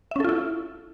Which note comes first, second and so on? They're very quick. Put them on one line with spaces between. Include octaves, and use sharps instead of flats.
E5 C#4 A4 F4 E4